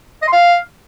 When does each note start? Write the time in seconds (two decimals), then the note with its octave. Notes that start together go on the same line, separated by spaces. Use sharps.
0.22 D#5
0.27 C6
0.32 F5